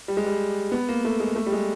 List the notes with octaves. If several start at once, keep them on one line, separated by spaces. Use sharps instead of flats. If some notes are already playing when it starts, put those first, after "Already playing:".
G3
G#3
G3
B3
A#3
A3
G#3
A3
G3
G#3